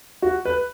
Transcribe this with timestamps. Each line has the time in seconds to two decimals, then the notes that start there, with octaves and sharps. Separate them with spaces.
0.22 F#4
0.45 B4